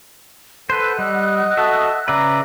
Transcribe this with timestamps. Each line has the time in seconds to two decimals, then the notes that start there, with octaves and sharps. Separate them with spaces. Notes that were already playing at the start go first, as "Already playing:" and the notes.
0.70 A4 B4 C5 F#5 E6 F#6
0.99 G3 D#5
1.57 F#4 A4 E5
2.08 C#3 B4 D5 E5 A#5